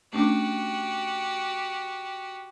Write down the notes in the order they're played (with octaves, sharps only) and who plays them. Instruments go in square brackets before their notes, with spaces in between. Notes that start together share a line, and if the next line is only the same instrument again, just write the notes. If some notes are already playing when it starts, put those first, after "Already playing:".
[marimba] A3 C#4 D4 [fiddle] F#4 G4